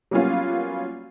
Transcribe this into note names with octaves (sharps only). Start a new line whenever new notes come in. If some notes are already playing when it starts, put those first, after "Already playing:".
F#3 G3 A#3 B3 C#4 F4